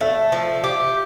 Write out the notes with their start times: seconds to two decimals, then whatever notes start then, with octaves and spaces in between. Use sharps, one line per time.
0.01 A3 E5
0.32 F3
0.64 G4